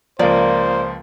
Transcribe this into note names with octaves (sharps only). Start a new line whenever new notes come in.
C#2 F3 A#3 C5 D5